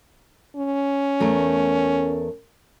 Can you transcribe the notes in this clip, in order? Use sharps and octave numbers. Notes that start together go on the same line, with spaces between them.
C#4
E2 A3 A#4